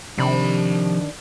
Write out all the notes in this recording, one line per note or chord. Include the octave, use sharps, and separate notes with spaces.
C3 D#3 F3 D4 B5